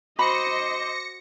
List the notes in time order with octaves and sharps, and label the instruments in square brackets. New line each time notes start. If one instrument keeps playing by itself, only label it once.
[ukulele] F#4 B5 [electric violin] C5 D#5 [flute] D6 [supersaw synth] A#6 C#7